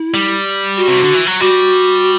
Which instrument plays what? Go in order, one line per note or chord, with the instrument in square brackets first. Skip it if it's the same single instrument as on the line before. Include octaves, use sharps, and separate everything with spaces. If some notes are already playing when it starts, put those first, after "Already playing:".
Already playing: [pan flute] E4
[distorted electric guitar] G3
[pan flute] F#4
[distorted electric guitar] C3
D3
E3
F#3
[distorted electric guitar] G3 [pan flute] F#4